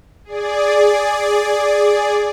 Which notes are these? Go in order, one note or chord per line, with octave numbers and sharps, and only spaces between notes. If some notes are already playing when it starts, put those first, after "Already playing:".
G#4 D5